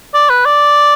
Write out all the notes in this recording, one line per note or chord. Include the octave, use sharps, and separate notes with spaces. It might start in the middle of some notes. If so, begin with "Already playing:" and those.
D5
B4
D5